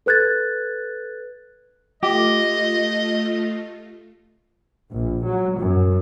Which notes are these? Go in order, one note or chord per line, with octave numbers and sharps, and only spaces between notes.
A4 B4 F#6 G#6 A6
A3 F4 G4 D#5
A#1
F#3
F#2